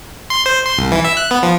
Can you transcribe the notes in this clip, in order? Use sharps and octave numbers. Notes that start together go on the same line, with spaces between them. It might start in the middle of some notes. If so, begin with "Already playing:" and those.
C6
C5
C6
C2
E3
E5
F#6
B3
F3